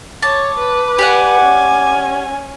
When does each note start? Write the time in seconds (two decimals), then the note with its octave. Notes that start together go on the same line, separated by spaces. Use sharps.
0.22 C#5 A5 D6
0.58 B4
0.99 G4 D5 F#5 G#5
1.41 C#4